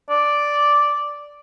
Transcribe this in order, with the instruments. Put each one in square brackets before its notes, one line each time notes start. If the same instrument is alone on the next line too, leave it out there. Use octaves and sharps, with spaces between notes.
[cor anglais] D5